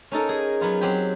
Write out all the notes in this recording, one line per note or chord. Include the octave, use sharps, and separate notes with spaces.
C#4 D#4 A4 A#4
G#4
F#3 B3 F4
F#3 C4 G4